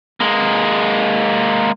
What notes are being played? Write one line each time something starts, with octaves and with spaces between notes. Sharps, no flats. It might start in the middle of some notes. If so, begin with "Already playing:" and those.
G#3 A#3